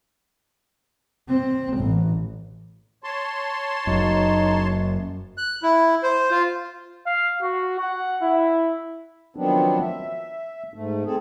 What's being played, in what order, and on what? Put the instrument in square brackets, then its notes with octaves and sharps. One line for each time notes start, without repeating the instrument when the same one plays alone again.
[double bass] C4
A1
[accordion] C#5 A5 C6
[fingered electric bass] F#1 F#2 [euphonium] D#4
[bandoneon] F#6
E4
C5
F4
[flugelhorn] F5
F#4
F#5
E4
[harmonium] D#3 F3 F#3 B3 C4 D4
E5
G#2 A3
C4 G#4 A4